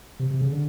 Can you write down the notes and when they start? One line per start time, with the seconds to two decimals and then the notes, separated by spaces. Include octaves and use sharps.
0.19 C3
0.31 C3
0.41 C#3
0.52 D3